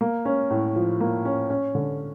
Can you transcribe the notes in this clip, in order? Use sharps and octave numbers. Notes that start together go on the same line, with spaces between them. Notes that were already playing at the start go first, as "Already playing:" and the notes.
A#3
C#4
A2
F3
A#3
C#4
C#4
D3